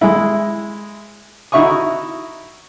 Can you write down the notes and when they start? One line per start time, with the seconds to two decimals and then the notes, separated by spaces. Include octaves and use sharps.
0.01 G#3 E4
1.52 D#4 E4 F#4 E5 C#6 D#6